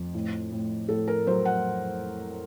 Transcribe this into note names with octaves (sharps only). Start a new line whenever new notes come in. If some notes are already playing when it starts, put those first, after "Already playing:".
Already playing: F2
A2
A2
A2 A4
A#4
F#3 C5
F#5